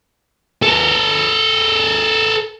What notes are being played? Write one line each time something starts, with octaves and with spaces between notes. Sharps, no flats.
A4 A#4